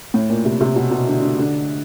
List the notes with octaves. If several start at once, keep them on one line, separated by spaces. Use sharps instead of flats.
A2
A#2
C3
C3
B2
B2
D3
D3
D3